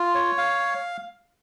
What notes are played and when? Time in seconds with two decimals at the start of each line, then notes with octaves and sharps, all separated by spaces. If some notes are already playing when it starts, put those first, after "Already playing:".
Already playing: F4
0.15 C#5
0.38 F5